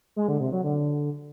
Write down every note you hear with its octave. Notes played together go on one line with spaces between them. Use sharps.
G#3
D3
C3
F#3
D3